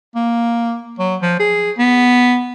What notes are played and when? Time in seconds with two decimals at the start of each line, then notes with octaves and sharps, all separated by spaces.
0.15 A#3
0.99 F#3
1.21 F3
1.40 G#4
1.78 B3